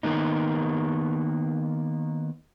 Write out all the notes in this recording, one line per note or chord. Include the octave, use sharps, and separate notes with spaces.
D#3 A#3 B3 D#4